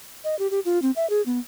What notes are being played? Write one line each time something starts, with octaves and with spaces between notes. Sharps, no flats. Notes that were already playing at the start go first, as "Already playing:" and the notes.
D#5
G4
G4
F4
C4
E5
G#4
B3